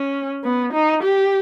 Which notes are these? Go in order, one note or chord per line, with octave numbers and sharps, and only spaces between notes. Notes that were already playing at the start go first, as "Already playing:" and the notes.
Already playing: C#4
B3
D#4
G4